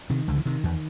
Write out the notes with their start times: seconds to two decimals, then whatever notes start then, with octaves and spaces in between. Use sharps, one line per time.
0.10 C3 D#3
0.28 C#2 D3
0.38 E3
0.46 C3 D#3
0.64 E2